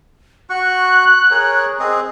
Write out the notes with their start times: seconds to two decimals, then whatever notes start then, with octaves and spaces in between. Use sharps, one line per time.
0.50 F#4 C#6 F#6
1.31 G#4 A#4 C#5
1.79 C4 G#4 D#5